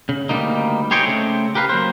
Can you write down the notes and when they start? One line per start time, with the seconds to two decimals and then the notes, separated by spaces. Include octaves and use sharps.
0.09 C#3
0.29 D2 G3 G#3 A#3 D#4
0.91 G4 G#4 C5 C#5 D#5 G5
1.05 C#3 A3 C4
1.55 G4 A#4 B4 F5
1.69 F#3 A#3 C5